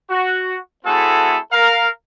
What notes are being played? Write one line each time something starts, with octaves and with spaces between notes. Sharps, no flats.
F#4
A3 C4 E4 F#4 G#4 A4
A#4 F5